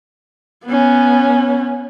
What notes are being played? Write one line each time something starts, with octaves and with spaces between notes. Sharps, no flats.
B3 C#4